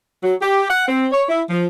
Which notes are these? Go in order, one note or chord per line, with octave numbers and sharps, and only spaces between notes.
F#3
G4
F#5
C4
C#5
E4
F3